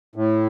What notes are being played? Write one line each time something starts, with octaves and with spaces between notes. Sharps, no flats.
A2